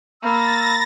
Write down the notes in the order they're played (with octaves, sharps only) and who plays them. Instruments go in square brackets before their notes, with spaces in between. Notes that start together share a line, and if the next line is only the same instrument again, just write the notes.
[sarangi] A#3 [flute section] B5 E6 [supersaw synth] A6 A#6